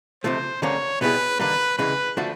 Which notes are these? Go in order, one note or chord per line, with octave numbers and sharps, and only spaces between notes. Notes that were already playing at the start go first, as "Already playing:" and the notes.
C#2 C3 F3 A3 C5
D2 D3 G3 A#3 C#4 C#5
B2 G3 B3 E4 G#4 B4
D#2 D3 G3 A#3 B4
D2 C#3 E3 G#3 B4
D3 F3 A3 D4 F#4